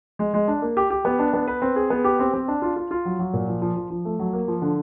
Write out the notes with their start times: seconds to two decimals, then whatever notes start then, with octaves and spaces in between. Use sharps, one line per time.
0.19 G#3
0.34 G#3
0.48 D4
0.62 A#3
0.77 G4
0.90 G4
1.05 B3
1.19 D4
1.33 B3
1.47 B4
1.62 C4
1.76 G#4
1.90 B3
2.04 G4
2.19 C4
2.34 C4
2.48 D4
2.62 F4
2.76 F4
2.91 F4
3.05 F#3
3.19 F#3
3.34 A#2
3.48 F3
3.62 F3
3.76 F3
3.90 F3
4.05 A3
4.19 F#3
4.33 A#3
4.48 F3
4.62 D3